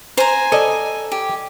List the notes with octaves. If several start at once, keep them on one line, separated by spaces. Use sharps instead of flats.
C5 G#5 A#5
A4 D5 D#5
G4